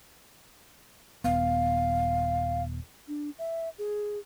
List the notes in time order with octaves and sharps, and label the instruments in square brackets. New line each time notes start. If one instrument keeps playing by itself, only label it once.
[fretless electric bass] D#1 B3 [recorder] F5
[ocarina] D4
E5
G#4